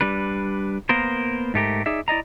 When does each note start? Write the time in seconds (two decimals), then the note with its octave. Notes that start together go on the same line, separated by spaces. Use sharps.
0.01 G3 D4 B4
0.89 A#3 B3 A#4 C5
1.54 G#2 A3 G4 A#4
1.86 D#4 G#4 D5 E5
2.08 E4 D5 D#5 A#5